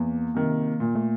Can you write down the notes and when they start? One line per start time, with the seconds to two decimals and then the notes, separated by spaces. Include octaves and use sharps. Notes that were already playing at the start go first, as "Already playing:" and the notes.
Already playing: E2 A#3
0.34 C3 D#3
0.79 A#2 A3
0.87 A#3
0.95 A3